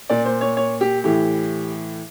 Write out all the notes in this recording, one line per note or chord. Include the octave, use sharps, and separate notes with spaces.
A#2 D5
C5
C#5
C#5
G4
A2 E3 G4